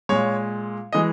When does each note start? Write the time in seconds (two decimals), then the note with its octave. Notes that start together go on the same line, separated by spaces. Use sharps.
0.09 A#2 G#3 C#5
0.93 E3 G#3 D#5